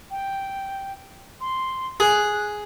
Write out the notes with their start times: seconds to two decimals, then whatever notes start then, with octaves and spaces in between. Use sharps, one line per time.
0.11 G5
1.41 C6
2.00 G#4 F#6